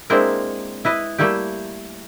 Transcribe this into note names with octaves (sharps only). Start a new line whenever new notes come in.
G#3 A#3 C4 D4 E4 A#4
E4 B4 D#5
G3 A3 A#3 E4 G4